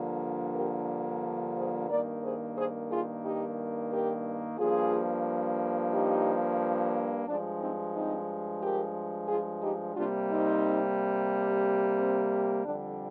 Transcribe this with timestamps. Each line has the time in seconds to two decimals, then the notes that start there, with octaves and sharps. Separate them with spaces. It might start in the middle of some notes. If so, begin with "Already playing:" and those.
Already playing: G2 D3 F3 A#3
0.55 G4 A#4
1.56 G#4 C5
1.89 G2 D#3 A#3 A#4 D5
2.23 G#4 C5
2.57 G#4 C5
2.90 F4 G#4
3.24 D#4 G4
3.91 G4 A#4
4.58 G2 F3 A#3 F4 G#4
5.93 D#4 G4
7.27 G2 F3 G#3 D4
7.60 C4 D#4
7.95 C4 D#4
8.62 G4 A#4
9.28 F4 G#4
9.62 D#4 G4
9.96 C3 G3 A#3 D4 F4
10.30 C4 D#4
11.97 C4
12.64 F2 D3 G3 D4